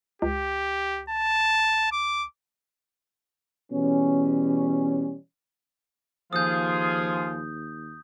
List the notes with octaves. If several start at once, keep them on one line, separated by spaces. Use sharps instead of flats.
C#2 G4
A5
D6
B2 E3 G3 C#4
D#2 F3 F4 G#4 D#6 G6